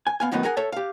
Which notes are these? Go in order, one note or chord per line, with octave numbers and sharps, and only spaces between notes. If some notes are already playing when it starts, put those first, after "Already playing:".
G#5
B3 F5 G#5
F#2 A2 D#3 B3 D#4
G#4 A#4 F#5 G#5
A4 C#5 E5 A5
G4 F5